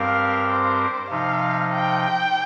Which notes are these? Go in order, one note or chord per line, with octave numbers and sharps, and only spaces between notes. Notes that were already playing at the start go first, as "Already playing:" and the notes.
Already playing: G2 G3 C4 G4 A#4 F5
C5
C3 F3 D#4 F5
G5